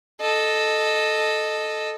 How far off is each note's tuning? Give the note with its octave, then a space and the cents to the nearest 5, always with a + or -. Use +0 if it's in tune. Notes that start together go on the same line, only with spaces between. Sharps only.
A4 -5 D#5 -10